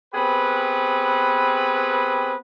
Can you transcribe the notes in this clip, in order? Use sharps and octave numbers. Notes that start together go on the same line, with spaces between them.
B3 C4 G4 G#4 B4